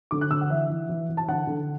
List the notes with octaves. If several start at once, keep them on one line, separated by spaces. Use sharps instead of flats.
D3 D6
F#6
D3 E6
F#5
E3 E5
E3
E3
E3
A5
D3 F#5
D3